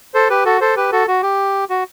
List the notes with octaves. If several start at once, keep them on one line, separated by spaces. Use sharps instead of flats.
A4 C5
G4 B4
F#4 A4
A4 C5
G4 B4
F#4 A4
F#4
G4
F#4